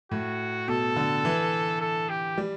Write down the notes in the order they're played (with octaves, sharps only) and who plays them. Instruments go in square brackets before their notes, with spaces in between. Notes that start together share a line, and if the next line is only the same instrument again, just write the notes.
[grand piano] A2 [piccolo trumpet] F#4
[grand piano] B2 [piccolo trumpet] A4
[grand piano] D3
E3
[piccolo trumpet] A4
G4
[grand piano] G3